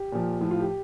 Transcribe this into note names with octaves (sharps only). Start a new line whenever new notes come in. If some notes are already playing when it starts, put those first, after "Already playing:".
Already playing: G4
A#2 F3
A2 F3
F4
G4